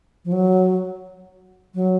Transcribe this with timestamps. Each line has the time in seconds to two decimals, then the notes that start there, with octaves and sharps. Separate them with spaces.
0.25 F3
0.32 F#3
1.75 F#3